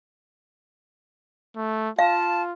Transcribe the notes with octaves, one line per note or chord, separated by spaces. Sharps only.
A3
F4 F5 A5